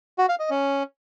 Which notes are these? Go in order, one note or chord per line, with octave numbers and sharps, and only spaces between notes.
F#4
F5
D#5
C#4